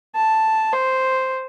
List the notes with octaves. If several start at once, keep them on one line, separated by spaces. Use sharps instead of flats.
A5
C5